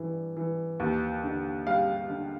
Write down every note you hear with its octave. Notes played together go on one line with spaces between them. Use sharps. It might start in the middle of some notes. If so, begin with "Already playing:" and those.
Already playing: G2 E3
E3
D#2
D3
G3 F5
D3